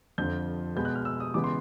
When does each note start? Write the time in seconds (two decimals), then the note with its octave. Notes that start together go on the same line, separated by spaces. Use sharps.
0.18 F2 D3 F3 G6
0.75 B2 G#3 B3 G6
0.85 F#6
0.95 F6
1.05 E6
1.20 D#6
1.34 C#3 E3 G#3 B3 D6
1.44 C6